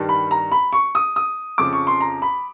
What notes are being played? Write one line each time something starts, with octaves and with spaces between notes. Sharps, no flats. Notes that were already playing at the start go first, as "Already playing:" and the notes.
Already playing: G2 D#3 G3
B5
A#5
B5
C#6
D#6
D#6
F2 C#3 F3 D6
C#6
C6
A#5
B5